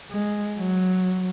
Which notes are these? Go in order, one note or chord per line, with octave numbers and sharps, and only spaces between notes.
G#3
F#3